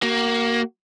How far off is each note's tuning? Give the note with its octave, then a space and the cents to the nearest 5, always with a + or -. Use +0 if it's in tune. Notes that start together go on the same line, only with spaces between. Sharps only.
A#3 +0 F#4 +30